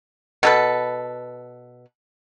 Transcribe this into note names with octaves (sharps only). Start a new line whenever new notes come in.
B2 A4 B4